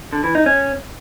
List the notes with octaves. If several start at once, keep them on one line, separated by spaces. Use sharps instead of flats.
D3
E3
D#4
C#4